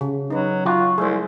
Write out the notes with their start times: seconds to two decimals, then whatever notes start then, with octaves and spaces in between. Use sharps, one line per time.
0.01 C#3
0.30 F#3 D#4 B4
0.66 F#3 F4 F#4
0.98 C2 G#3 A3 G#4 C5